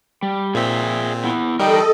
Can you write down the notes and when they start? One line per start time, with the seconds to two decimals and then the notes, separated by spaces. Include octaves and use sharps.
0.23 G3
0.55 A#2 C4 G#4 E5
1.24 B3 E4
1.59 G3 D#4 A4 A#4 D#5 F#5 G5